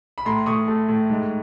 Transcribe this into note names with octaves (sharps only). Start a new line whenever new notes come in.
B5
A2 A#5 C6
A2 C#6 D#6
A3
A2
G#2